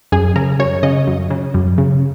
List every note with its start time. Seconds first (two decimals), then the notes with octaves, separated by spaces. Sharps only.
0.12 F#2 G#4
0.36 C#3 A#4
0.59 F#2 C#5
0.83 C#3 D#5
1.07 F#2
1.30 C#3
1.54 F#2
1.78 C#3